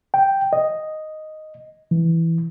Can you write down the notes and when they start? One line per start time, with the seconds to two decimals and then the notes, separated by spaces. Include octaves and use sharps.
0.14 G5
0.53 D#5
1.91 E3